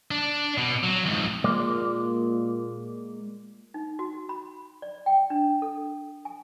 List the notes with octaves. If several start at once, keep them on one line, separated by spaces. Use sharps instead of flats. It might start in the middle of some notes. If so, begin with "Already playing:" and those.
D4
B2
F#3
F2 G#2
A#2 G#3 A#3 D5
D#4
F#4
B5
D5
G5
D4
A4
G#5